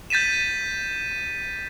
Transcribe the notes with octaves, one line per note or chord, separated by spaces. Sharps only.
G6 A6 B6 D#7 E7